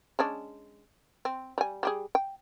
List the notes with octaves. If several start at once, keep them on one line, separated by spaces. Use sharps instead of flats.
G#3 C#4 D4
C4
G3 G#5
G3 G4 G#4
G5